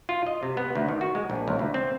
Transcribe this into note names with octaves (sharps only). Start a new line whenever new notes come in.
F4
D#5
C3
B3
D2
D#3
F#4
G#3
A#1
C#2
D2
C4